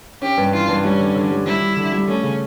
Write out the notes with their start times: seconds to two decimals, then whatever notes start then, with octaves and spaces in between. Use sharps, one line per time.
0.22 C#4 G4
0.37 G2
0.53 E3 F4
0.68 G2
0.84 G3 C#4
0.99 D3
1.15 D3
1.31 G3
1.46 G3 E4
1.61 G3
1.76 D3
1.92 G3
2.08 A3 C#4
2.23 C#3